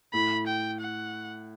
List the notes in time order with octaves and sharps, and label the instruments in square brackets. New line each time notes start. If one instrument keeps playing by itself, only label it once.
[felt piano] A2 [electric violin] B5
[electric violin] G5
F#5